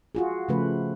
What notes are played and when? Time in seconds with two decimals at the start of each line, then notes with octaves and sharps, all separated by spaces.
0.15 F4 F#4 G#4
0.49 C#3 F3 A3 B4